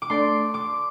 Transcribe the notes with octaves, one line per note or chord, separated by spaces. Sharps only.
D6
A3 D4 A4 D5 C6
D6